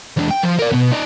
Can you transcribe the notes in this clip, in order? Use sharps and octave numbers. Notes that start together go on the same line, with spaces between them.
E2 D4
G5
F3
A#4 D5
B2 B3
D#4 D5